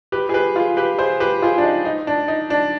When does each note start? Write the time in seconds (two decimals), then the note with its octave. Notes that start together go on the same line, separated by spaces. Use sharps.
0.12 G4 B4
0.29 G#4
0.34 G4 B4
0.56 F4 G#4
0.77 G4 B4
0.99 G#4 C5
1.20 G4 B4
1.42 F4 G#4
1.58 D4
1.63 D#4
1.85 D#4
2.07 D4
2.28 D#4
2.50 D4